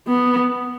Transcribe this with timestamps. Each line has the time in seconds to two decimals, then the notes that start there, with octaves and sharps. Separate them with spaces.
0.08 B3